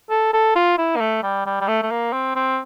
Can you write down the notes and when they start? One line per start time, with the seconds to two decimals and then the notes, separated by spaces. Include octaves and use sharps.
0.10 A4
0.33 A4
0.56 F4
0.78 E4
0.96 A#3
1.00 A3
1.23 G3
1.46 G3
1.61 G3
1.68 A3
1.83 A3
1.91 A#3
2.13 C4
2.35 C4